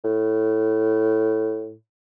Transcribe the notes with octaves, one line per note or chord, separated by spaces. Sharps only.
A2